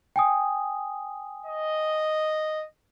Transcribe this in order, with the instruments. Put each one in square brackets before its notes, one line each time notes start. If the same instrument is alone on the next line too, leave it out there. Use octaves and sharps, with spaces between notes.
[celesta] G5 G#5 D#6
[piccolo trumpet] D#5